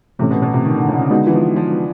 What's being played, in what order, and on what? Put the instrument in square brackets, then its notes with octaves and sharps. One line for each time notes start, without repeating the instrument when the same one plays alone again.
[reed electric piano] A2 E3 A3 C#4 [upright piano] C3
[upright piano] B2
B2
C3
D#3
D3
C#3
D3
C#3
[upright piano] D3 [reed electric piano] G#3 B3 D#4 F#4 B4
[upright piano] E3
F3
F3